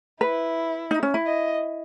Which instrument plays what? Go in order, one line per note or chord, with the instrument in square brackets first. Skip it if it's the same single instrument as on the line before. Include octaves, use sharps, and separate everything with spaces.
[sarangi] E4 [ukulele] B4
[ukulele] D#4
C#4
E4
[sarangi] D#5